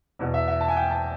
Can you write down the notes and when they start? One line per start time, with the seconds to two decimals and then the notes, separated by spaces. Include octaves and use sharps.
0.19 E2 B2
0.34 E5
0.48 E5
0.60 A5
0.68 G#5
0.76 G5
0.91 A5